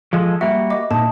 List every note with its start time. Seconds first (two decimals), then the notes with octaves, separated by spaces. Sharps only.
0.13 F3 G#3 A4
0.41 G3 A#3 F#4 E5
0.70 D#5 D6
0.91 A#2 D#4 A5